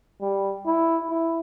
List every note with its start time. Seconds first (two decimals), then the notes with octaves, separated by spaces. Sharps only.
0.21 G3
0.66 E4
1.10 E4